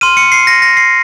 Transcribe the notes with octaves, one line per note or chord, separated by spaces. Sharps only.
C6 F6 D#7
C#7
C7
A#6
A#6
C7